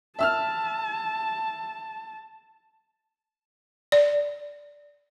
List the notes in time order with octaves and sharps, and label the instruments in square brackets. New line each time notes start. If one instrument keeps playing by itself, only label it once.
[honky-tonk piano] E5 E6 F6 [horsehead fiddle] A5
[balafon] D5